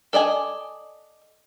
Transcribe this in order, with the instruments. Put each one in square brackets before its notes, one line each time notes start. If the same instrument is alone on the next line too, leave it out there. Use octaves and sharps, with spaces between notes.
[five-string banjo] A4 D5 D#5 G#5